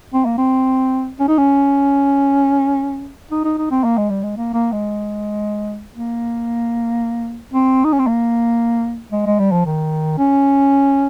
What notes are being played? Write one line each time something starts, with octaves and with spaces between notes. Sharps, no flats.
C4
A#3
C4
C#4
D#4
C#4
D#4
D#4
D#4
C4
A#3
G#3
G3
G#3
A#3
A#3
G#3
A#3
C4
D#4
C#4
C4
A#3
G#3
G#3
G3
F3
D#3
C#4